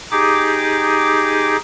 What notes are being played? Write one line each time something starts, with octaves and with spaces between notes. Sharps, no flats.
D#4 G4 G#4 D6